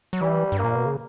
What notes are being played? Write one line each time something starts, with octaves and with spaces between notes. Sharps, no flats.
F#3
E3 G3
G2
A#2 A#3
B2
C#3